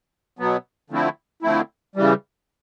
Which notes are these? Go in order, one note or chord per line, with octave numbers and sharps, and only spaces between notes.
B2 F#3 B3
D3 F3 A3 C4 E4
D3 F3 A3 C4 E4
C#3 E3 G3